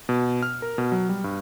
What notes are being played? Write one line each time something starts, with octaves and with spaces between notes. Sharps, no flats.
B2
F6
A#4
B2
F#3
G3
G2